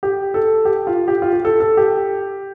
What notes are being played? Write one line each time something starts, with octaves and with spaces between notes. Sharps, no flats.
G4
A4
G4
F4
G4
F4
G4
A4
A4
G4